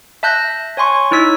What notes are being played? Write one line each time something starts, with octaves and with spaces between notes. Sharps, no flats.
E5 A5 F#6 G6 A#6
C#5 G#5 C6 C#6
D#4 E4 C#5 E6 B6